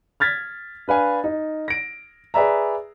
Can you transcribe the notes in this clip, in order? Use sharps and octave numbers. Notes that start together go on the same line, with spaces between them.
F6 G#6 A6 B6
D4 B4 F5 G#5
D#4
A#6 D7
G#4 B4 D5 E5 A#5